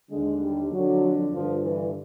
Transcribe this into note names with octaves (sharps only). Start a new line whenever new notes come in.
D#2 D3 G#3
G3
F2 D3 F#3
G2 D3 F3
E3